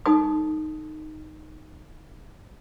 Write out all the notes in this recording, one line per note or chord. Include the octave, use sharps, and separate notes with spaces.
D#4 A4 D#6